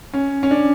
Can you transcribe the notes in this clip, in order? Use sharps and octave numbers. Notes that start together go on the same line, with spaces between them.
C#4
C#4
D4